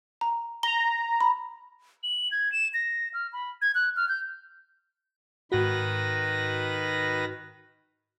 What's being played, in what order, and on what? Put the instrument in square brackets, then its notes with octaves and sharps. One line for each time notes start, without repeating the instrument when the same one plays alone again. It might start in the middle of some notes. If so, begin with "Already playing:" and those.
[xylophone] A#5
[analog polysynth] A#5 [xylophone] G7
[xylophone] B5
[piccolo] F#7
G#6
E7
A#6
F6
B5
G#6
F#6
F6
G6
[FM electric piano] G#2 F#4 [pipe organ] D#3 B4 A#6